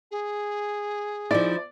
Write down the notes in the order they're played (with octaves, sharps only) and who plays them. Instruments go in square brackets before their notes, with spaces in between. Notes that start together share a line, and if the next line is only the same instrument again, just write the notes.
[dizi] G#4
[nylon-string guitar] F3 D#4 E4 [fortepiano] D5